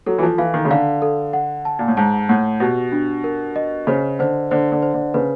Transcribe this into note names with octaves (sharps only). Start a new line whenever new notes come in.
F#3 A4
E3
F3
E3 F5
D#3
C#3
D3 F5
A4
F#5
A5
A#2
A2
G#2 A5
A2 F#5
B2 G4
D4
A#4
D#5
C#3 C5
D3 C5
D3 C5
D3
C5
D3
C#3 B4